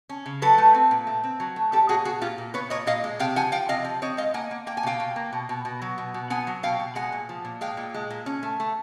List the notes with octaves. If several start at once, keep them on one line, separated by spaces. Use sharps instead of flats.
C#4
C#3
F#3 A4 B4
A3
C4
A#2
A3
C4
F#3
A3
G3 G4 A4
A#2 F#4 G#4
B3 F#4 G#4
A#2 F4 G4
A#2
B3 B4 C#5
A#2 C#5 D#5
A#2 D#5 F5
G#3
C3 F5 G5
F3 F#5 G#5
F3 F5 G5
C3 D#5 F5
F3
C4 C#5 D#5
G#3 D#5 F5
A#3 F#5 G#5
A#3
A#3 G5
G#5
B2 F5 G5
B2
A#3
B2
B2
B2
F#3
B2
B2
B3 F#5 G#5
F#3
B2 F5 G5
B2
G#3 F#5 G#5
A#2
F3
A#2
G#3 F5 G5
A#2
G#3
A#2
C#4
A3
A3